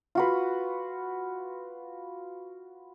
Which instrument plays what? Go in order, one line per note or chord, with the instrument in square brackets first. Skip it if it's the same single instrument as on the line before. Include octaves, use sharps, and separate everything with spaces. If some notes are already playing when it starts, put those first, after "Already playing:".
[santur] F4 F#4 B4